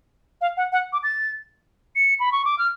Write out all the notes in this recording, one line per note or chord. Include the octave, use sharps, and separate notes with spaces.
F5
F#5
F#5
D6
A6
C#7
B5
C#6
D6
F6